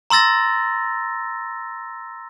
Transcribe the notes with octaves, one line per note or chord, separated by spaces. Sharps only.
A#5 C6 E6 A6 A#6